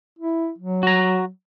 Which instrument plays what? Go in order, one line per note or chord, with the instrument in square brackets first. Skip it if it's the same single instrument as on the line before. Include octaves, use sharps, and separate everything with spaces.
[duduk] E4
F#3
[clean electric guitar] F#4 A#5